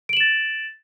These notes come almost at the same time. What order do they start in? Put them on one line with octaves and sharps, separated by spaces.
D7 F#7 E7 A6